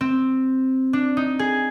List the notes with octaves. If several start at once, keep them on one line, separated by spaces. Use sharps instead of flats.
C4
D4
D#4
G#4